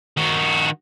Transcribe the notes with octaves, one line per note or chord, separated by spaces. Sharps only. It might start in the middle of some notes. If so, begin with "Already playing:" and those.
D#3 F#4